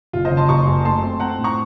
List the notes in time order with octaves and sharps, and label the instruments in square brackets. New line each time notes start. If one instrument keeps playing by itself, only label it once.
[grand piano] F#1 [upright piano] F4
[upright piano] C5 D#5
[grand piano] C#3
[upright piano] A5 C6
[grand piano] F#1 [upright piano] A#5 C#6
[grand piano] F#2
[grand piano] A3 [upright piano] A5 C6
[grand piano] C4
[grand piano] C4 [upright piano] F#5 A#5
[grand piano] A2
[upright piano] A#5 C#6